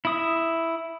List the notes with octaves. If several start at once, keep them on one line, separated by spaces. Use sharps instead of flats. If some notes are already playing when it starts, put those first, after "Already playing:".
E4 D#6